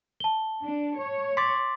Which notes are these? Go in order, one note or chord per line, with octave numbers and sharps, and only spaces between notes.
A5 G7
D4
C#5
C6 D6 A6 B6